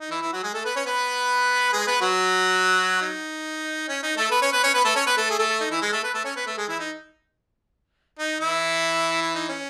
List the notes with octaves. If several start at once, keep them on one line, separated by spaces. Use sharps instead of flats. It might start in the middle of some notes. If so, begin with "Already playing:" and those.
D#4
E3 E4
E3 E4
F#3 F#4
G#3 G#4
A3 A4
B3 B4
C#4 C#5
B3 B4
G#3 G#4
B3 B4
F#3 F#4
D#4
C#4
D#4
A3 A4
B3 B4
C#4 C#5
B3 B4
C#4 C#5
B3 B4
A3 A4
C#4 C#5
B3 B4
A3 A4
G#4
A3 A4
D#4
E3 E4
G#3 G#4
A3 A4
B3 B4
A3 A4
C#4 C#5
B3 B4
A3 A4
G#3 G#4
E3 E4
D#4
D#4
E3 E4
E4
D#4
C#4